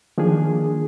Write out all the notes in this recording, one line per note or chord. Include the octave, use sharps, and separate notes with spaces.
D#3 F3 A#3 D4 G#4